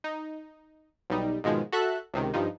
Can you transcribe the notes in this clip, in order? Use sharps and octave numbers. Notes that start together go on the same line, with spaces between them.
D#4
B1 G3 D#4
G#2 B2 D#3 F3 G#3
F#4 A4 E5 F#6
C#2 C3 D#3
G2 F3 D#4